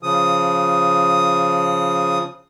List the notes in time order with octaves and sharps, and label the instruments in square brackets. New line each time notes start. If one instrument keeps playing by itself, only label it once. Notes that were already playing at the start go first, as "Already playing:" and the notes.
[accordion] C#3 F3 D#6